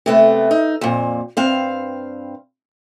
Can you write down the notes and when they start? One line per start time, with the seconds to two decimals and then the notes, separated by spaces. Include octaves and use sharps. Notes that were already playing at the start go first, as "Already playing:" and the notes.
0.06 C3 A3 B3
0.51 D#4
0.81 F2 A#2
1.37 G2 C4 F5